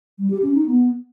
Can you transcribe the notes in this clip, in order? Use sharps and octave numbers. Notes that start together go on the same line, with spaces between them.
G3
G4
C#4
D#4
B3